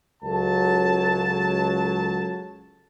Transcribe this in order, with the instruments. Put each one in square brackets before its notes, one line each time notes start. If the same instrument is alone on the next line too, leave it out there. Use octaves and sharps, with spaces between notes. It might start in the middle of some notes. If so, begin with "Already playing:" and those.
[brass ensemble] C#2 F#3 A4 A5